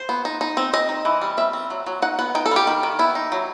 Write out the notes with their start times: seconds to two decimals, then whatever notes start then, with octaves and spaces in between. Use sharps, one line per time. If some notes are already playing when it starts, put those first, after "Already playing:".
Already playing: C5
0.09 B3
0.25 D#4
0.41 D#4
0.57 C4
0.73 C4 D#5
0.89 D#4
1.05 E3
1.22 G3
1.37 C4 E5
1.53 C4
1.70 F#3
1.86 F#3
2.02 D#4 F#5
2.19 B3 F#5
2.35 D#4 G5
2.46 A4
2.51 G3 G4
2.67 D#3
2.83 D#3
2.99 B3 E4
3.15 D#4
3.32 F#3